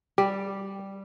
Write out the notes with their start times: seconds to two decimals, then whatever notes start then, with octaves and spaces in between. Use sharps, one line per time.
0.18 G3 G4